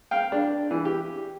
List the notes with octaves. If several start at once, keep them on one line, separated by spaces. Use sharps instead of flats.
F5 G5
D4
E3
G4